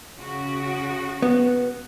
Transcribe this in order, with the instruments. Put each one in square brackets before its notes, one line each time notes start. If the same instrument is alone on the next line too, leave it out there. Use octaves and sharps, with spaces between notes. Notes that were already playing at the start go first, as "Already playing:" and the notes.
[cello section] C#3 F#4
[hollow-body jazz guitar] B3